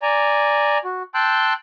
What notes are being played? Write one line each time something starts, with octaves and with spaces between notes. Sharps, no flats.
D5 G#5 A#5
F#4
G5 A5 C6 E6 F#6 G6